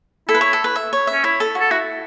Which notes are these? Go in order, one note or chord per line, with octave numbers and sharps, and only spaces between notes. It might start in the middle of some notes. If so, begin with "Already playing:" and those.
E4 A4
B4
C#5
A4
B4
E5
C#5
E5
C#4
E4 C#5
A4
F#4 A4
E4 F#4